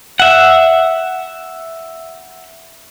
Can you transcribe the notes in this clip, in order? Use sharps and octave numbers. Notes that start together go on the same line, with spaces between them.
E5 F#5